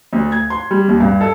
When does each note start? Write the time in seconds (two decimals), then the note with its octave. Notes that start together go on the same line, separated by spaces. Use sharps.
0.13 D2
0.32 G#6
0.50 C6
0.71 G3
0.88 D#2
1.00 G2
1.21 A4